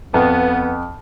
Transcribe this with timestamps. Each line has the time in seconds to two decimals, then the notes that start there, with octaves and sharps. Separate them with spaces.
0.14 F2 B3